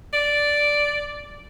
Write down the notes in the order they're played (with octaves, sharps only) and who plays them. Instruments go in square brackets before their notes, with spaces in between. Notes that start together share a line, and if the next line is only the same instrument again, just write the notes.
[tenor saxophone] D5